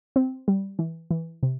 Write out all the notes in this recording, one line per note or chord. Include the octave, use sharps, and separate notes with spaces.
C4
G3
E3
E3
C3